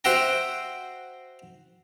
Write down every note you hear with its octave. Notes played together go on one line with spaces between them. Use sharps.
F#4 C5 E5 F#5 G5 A#5